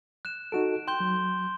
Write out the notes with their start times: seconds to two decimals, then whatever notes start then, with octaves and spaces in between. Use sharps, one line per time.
0.25 F#6 E7
0.52 D#4 F#4 A4 D7 E7
0.88 G5 C6 G6 G7
1.00 F#3